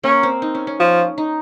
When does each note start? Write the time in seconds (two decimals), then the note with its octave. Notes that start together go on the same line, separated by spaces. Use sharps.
0.04 A#3 C#4
0.23 C4
0.42 D#4
0.55 C#4
0.67 C#4
0.80 F3
1.18 D#4